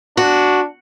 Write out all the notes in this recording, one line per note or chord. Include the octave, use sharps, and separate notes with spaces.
D4 F#4